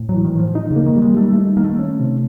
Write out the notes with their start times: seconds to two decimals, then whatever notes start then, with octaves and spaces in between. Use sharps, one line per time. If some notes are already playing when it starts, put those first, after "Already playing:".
Already playing: A2
0.09 F#3
0.14 E3
0.24 D#3
0.35 A2 F3
0.55 D#4
0.71 C#3
0.76 A#3
0.86 D#3
0.96 G3
1.02 G#3
1.17 G3 A3
1.33 A3 D#4
1.57 D#3 A#3
1.64 A3
1.79 C#4
2.00 C3